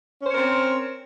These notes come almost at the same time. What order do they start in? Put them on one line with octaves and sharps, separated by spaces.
C#4 C5 C#5 A#4 C4